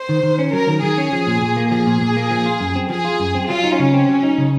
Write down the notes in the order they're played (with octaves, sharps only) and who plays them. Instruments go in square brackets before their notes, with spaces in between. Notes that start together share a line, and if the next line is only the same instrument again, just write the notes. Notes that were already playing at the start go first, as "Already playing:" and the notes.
Already playing: [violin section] C5
[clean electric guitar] D#3
D#3
C#4
[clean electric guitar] F#3 [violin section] A#4
[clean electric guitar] D#3
[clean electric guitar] D#3 [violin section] G#4
[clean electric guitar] C#4
F3
A#2
A#2
A#3
[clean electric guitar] F3 [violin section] G#4
[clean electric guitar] A#2
A#2
A#3
F3
F4
F#2
C4
[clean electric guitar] F3 [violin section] G#4
[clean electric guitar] F4
F#2
C4
[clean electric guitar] F#3 [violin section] F4
[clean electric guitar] D#4
[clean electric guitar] C#3 [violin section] C#4
[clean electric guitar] C4
F#3
D#4
C#3